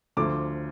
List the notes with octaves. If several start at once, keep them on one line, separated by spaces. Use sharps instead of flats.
D2 D3 F3 D6